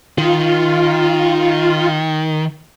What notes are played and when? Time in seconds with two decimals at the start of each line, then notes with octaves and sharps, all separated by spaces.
0.18 D#3 F4